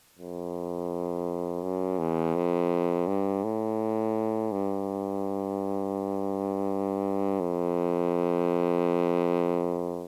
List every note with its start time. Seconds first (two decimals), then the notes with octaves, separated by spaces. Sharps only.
0.19 F2
1.63 F#2
1.99 E2
2.35 F2
3.07 G2
3.44 A2
4.52 G2
7.40 F2